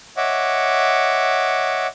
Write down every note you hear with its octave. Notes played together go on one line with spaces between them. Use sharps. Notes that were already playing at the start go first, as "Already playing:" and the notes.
C#5 D#5 E5 F#5 D6